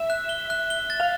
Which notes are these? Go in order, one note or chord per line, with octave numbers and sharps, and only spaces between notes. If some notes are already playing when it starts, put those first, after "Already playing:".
Already playing: E5
F#6
G7
F#6
G7
A6
F5